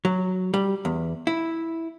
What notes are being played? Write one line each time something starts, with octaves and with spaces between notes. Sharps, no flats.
F#3
G3
E2
E4